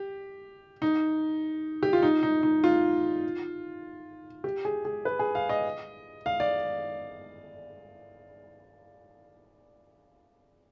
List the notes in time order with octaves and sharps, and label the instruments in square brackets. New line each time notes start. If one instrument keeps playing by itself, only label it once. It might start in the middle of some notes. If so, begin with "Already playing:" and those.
Already playing: [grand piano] G4
D#4
G4
F4
D#4
D#4
D#4
F4
G4
G#4
G#4
B4
G#4
F5
D#5
F5
D5